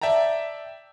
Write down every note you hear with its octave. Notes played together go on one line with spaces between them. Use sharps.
D5 E5 G5 A5 A#5